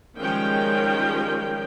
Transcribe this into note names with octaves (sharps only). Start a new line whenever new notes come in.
D#3 F3 G3 G#3 C#4 G5